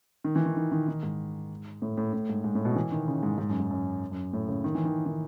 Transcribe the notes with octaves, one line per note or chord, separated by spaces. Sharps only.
D#3
E3
D#3
D#3
D#3
D#3
G#2
A2
A2
A2
G#2
G#2
A2
B2
E3
D#3
C#3
G#2
G#2
F#2
G#2
F#2
F#2
A2
C#3
D#3
E3
D#3
D#3